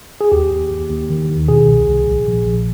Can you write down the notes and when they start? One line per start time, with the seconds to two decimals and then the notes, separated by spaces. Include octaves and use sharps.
0.21 G#4
0.32 D#2 G4
0.51 D#2
0.71 D#2
0.90 D#2
1.10 D#3
1.29 D#3
1.49 B2 G#4
1.68 C2
1.87 C2
2.07 A#1
2.26 A#1
2.46 A#1